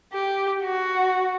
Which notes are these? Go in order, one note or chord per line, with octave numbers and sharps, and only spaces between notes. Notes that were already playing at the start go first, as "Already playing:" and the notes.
G4
F#4